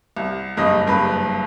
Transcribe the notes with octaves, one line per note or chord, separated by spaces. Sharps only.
C2
F#1 G2 D#5 A#6
F#1 G2 B4